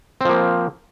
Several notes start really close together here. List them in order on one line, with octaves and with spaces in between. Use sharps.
C4 F3 A#3